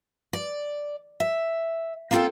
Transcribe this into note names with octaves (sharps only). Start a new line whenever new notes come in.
D5
E5
A#3 C4 F4 A4 C5 G5